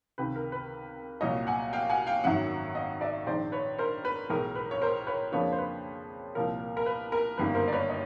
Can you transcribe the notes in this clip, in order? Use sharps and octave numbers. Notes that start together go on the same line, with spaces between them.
C#2 C3 D#3 B4
A#4
B4
C2 A#2 F#3 C#5 D#5
F#5 G#5
F5 G5
F#5 G#5
F5 G5
G#1 F#2 D#3 F#3 E5 F#5
D#5 F5
D5 E5
A#1 G#2 D#3 C5 D5
B4 C#5
A#4 C5
B4
B1 A2 E3 G#3 A#4
B4
C#5
A#4 C5
B4 C#5
F2 C#3 F3 A#3 D4 B4 C#5
C5
B4
C2 A#2 F3 A#4
A#4
B4
A#4
G1 F#2 D#3 G3 A#3 B4
A#4 C5
D5
B4 C#5
C#5 D#5